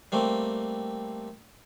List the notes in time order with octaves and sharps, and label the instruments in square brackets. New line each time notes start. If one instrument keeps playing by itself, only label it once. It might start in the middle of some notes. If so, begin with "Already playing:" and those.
[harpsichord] G3 A3 A#3 C4